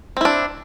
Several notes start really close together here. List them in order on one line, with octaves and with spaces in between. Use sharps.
C4 E4 D4